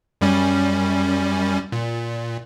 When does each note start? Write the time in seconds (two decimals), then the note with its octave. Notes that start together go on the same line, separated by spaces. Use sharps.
0.21 F#2 G3 C#4
1.72 A#2